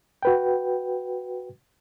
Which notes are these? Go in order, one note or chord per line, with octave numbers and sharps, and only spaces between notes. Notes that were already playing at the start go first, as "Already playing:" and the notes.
F#4 B4 G5